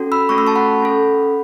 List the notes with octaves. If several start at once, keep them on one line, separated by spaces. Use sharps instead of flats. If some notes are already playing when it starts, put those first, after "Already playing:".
Already playing: C#4 F#4 A4
B5 E6
A3 C#4 F#4 A4 C#6
E6
A5 C#6
F#5 B5
C#4 A4